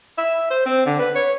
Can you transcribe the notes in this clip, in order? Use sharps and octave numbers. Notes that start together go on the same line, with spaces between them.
E5
C5
C4
D3
B4
C#5